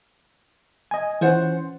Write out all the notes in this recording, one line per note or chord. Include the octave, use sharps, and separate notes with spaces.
D#5 G#5
E3 C#4 F4 C5 F#5